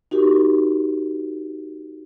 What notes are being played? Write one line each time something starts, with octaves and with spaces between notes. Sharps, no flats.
D#4 F#4 G4 A#4